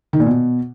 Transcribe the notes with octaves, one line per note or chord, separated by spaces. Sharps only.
D#3
A#2
B2